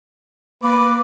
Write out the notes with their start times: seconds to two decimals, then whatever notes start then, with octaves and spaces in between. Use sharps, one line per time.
0.63 A#3 B4 D6